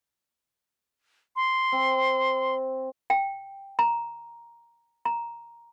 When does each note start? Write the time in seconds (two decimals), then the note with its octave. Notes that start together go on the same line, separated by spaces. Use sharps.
1.36 C6
1.72 C4
3.10 G5
3.79 A#5
5.05 A#5